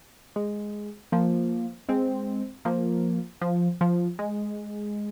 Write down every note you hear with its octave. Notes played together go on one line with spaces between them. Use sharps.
G#3
F3 A#3
G#3 C4
F3 A#3
F3
F3
G#3